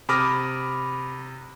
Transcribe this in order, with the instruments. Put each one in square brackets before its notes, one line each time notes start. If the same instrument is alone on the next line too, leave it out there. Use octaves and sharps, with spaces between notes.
[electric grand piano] C3 B5 D6 D#6 F6 A#6